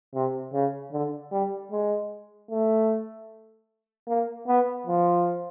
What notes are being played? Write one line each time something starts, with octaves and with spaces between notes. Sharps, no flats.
C3
C#3
D3
G3
G#3
A3
A#3
B3
F3